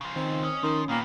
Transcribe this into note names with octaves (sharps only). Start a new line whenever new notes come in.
C#3 F3
D#3 C4
C#4 D#5
D#3 F3 C#4
A#2 D#3 A#3 B3